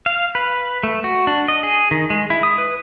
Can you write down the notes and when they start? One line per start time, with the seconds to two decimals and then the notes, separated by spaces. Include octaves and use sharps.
0.06 F5
0.35 B4
0.83 A3
1.04 F#4
1.27 D4
1.48 D#5
1.63 G#4
1.91 D#3
2.10 G#3
2.30 E4
2.43 D#6
2.58 B4